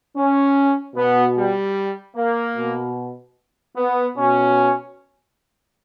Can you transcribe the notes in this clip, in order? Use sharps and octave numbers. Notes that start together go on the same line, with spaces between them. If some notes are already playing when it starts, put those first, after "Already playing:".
C#4
B2 B3
G3
A#3
B2
B3
B2 C#4